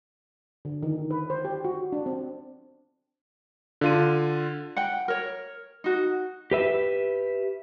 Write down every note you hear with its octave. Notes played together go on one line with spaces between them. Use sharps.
D3
D#3
B4
C5
G4
F#4
D4
C4
D3 F4 D#7
F#5 G5
A#4 C#5
D#4 F#4
G4 B4 E5